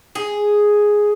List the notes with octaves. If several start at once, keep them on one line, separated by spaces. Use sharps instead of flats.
G#4